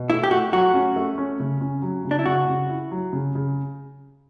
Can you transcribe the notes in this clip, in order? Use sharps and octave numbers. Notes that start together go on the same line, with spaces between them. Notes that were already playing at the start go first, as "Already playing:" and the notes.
Already playing: B2
A3 E4
G4
A3 F#4
F#3 F#4
C#4
A3
C#4
C#3
C#4
F#3
C#3
D4
E4
C#3 F#4
C#3
E4
F#3
C#3
C#3